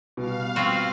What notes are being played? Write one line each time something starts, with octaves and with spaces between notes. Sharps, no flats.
B2 G3 F5
C4 F4 F#4